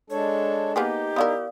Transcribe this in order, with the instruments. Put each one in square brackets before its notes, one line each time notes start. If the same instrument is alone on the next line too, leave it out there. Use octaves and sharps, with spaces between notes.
[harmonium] G#3 D4 A4 [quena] C#5
[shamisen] A#3 B3 G#4 [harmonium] D#4 [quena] G4
[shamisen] B3 E4 A#4 [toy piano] D5 F5 D#6